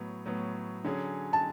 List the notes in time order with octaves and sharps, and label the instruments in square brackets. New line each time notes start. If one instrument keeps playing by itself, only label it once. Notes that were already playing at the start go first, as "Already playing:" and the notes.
Already playing: [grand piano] A2 F#3 B3
A2 F#3 B3
D3 F#3 C#4 G#4
[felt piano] A5